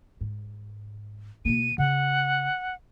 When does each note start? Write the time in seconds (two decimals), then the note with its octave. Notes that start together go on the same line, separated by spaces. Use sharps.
0.21 G#2
1.45 B2 A#3 D#7
1.78 C#3 F#5